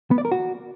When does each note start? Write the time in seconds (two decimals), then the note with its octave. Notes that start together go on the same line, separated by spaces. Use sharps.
0.11 B3
0.18 D5
0.25 A#4
0.32 F#4